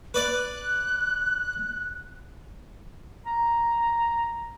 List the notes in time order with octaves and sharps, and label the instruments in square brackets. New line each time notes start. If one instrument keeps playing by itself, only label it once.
[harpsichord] B4 D5 [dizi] F#6
[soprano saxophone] A#5